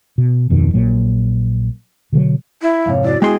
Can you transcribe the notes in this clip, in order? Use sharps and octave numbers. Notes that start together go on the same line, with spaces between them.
B2
D1 F2 B2 D#3
A#1 A#2 F#3
B2 D3 E3 F#3
E4
F2 G#2 C3 C#5 F5
E4 F#4 D5
G#3 B3 G#4 D#5 G5 C6